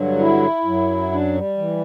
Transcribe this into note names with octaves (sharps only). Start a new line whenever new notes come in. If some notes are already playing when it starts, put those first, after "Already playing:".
Already playing: G2 D3 F#3
E4
F#2 F#3
D4
G3
E3